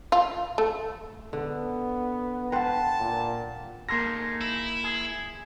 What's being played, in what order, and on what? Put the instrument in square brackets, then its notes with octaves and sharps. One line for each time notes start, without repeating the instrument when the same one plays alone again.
[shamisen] F4
A3
[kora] D3 [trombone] B3
[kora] B4 C5 [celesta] F#5 G5 [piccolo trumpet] A5
[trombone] A#2
[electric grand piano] A#3 C6 A#6 [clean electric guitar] D#4 G#4 A4
[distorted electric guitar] E4
[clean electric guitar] G#4